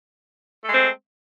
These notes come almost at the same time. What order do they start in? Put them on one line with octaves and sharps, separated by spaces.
A3 G#3 C4